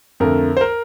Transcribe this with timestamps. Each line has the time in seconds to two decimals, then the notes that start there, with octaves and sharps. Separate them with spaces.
0.20 F2 D3 A3 A#4
0.57 C5
0.61 A#4